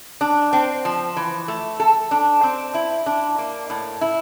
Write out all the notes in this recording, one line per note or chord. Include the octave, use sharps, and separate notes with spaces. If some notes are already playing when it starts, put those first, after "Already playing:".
D4
C4
F3
E3
A3
A4
D4
C4
E4
D4
A#3
A2
E4